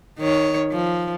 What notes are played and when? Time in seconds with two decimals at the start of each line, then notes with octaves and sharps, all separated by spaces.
0.19 D#3 C#5
0.72 F3